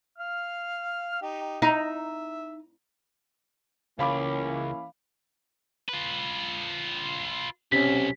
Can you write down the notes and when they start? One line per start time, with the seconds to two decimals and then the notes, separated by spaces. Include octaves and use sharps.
0.18 F5 F6
1.22 D#4 G4
1.62 D#4 E5
3.99 C#2 E3 A#3 C#4 F5 B5 D6
5.89 F4 B4
7.72 B1 C3 C#4 B6